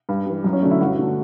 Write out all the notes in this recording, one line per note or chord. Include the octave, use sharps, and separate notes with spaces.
G2
E3 G3
F#2
C#4
D3 F#3 A3 D4
E4
G2 F#4
D3 F#3 A3